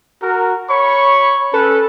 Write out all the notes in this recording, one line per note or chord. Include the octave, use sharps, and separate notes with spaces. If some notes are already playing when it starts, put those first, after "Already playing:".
F#4 A#4
C#5 B5 C#6
C#4 A4 B4